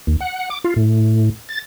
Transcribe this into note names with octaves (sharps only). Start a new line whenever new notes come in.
D#2
F#5
D6
F4
A2
A6